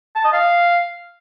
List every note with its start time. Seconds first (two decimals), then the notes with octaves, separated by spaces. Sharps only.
0.16 A5
0.24 D#5
0.33 F5